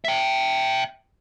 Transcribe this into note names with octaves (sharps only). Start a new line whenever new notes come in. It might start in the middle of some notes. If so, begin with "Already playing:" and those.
E5 G5